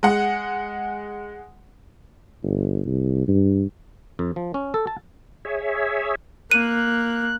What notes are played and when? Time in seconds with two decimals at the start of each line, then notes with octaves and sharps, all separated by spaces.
0.03 G#3 F#5
2.43 G1
2.86 C2
3.28 G2
4.19 F2
4.36 F3
4.54 C#4
4.74 A4
4.87 A5
5.45 G#4 C#5 E5
6.51 A#3 F#6 D#7